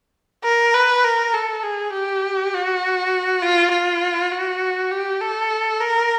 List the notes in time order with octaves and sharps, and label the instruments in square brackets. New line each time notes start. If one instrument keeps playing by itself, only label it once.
[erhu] A#4
B4
A#4
A4
G#4
G4
F#4
F4
F4
F#4
G4
A4
A#4